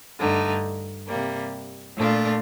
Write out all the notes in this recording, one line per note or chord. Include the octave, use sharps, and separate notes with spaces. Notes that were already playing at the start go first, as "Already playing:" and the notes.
G2 D3 A3 D#4
C3 G3 A#3
A#2 A3 D4 F4